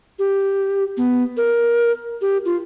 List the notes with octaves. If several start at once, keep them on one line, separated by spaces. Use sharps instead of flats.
G4
B3
A#4
G4
F4